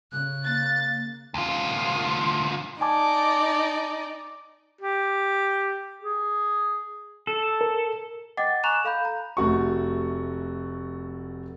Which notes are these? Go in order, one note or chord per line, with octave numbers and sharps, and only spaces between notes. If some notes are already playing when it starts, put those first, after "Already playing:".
C#3 F#6
A#3 A6
D2 F4
D#4 D5 G#5 A5 D6
G4
G#4
A4
A#4
D#5 F#5 G5 D6 A6
G#5 A#5 C#6 F#6 E7 F7
A4 F5 B5 G6
A#5
F1 A3 F#4 C#6